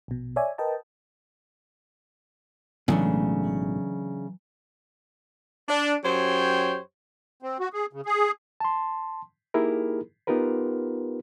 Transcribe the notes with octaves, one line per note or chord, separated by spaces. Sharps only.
A#1 B2
C#5 D5 E5 G#5
A#4 B4 D#5 G5 A5
B1 A2 C#3 E3 F#3 G#3 A3 D4
D4
F#2 G4 C5 C#5 G5
C4
F#4
G#4
C#3
G#4
A5 C6
A#3 D#4 E4 G4 G#4 A#4
B3 D#4 F4 G4 A#4 B4